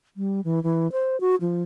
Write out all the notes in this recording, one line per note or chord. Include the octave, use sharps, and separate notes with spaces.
G3
E3
E3
C5
F#4
F3